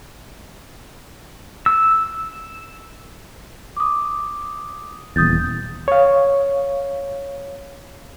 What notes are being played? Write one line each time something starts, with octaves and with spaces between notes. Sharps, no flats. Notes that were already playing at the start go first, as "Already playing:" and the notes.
E6
D6 D#6
D#1 E2 D#6 G6 A6
C#5 F5